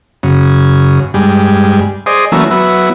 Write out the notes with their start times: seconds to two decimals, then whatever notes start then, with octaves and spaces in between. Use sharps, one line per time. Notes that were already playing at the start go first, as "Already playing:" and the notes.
0.23 F#2 C#3
1.14 G2 G3 G#3
2.06 G#4 C5 D5 D#5
2.32 E3 F#3 A3 A#3 C#4 E4
2.51 F#3 B3 E4